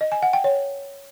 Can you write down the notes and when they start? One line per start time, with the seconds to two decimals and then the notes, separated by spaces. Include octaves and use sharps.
0.01 D#5
0.12 G#5
0.22 F#5
0.33 G5
0.44 C#5